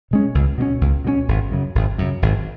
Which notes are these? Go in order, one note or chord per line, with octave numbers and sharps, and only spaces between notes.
B2 G#3 C#4
C#2
B2 G#3 C#4
C#2
B2 G#3 C#4
G#1
F#2 C#3
G#1
F#2 C#3
G#1